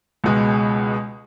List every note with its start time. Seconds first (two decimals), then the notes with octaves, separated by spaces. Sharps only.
0.24 C#2 B2 G#3